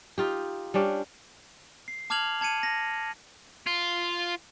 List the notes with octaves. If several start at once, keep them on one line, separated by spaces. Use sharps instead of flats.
D#4 F4 G4
G3 C#4 D4 G4
C7
A5 D6 F6 G#6 F7 F#7
A5 G#6 C#7 D#7
A#6
F4